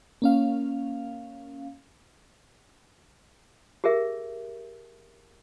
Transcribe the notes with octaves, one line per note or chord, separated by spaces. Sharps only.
A#3 C#4 F5
G4 G#4 A#4 E5